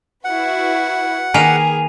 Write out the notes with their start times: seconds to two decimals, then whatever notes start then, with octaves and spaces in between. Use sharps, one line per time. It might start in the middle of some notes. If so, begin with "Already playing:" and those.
0.25 E4 F#4 B4 F#5
1.34 D#3 A#3 G#4 B4 G#5 D#7 F7